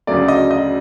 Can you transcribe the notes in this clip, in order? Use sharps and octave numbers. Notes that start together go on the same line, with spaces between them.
D2 C#3 F#3 A3 D5
D#5
D#5